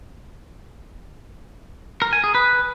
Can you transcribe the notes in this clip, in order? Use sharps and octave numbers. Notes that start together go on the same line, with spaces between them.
A#4
G#5
G#4
B4